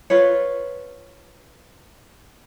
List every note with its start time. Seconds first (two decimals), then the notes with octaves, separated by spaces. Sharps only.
0.10 F4 B4 C#5